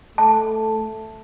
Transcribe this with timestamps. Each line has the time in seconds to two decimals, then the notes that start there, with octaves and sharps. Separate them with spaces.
0.18 A3 A5